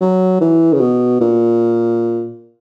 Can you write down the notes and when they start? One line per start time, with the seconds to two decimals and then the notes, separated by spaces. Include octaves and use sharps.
0.01 F#3
0.41 E3
0.73 C#3
0.81 B2
1.21 A#2